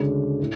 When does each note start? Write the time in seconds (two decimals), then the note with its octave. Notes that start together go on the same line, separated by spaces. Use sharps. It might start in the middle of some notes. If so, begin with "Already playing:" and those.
Already playing: D2 C#3 G#3 D4
0.40 A2